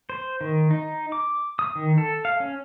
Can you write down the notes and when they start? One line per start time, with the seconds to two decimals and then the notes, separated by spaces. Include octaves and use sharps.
0.10 C5
0.41 D#3
0.71 D#4
1.12 D6
1.59 D#6
1.75 D#3
1.98 A4
2.25 F5
2.40 C#4